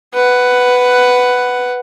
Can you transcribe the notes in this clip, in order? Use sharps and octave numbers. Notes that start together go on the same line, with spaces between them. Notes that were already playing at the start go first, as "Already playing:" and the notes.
B4 F#5